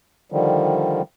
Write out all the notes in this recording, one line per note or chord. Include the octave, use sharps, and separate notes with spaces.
D3 D#3 F3 G3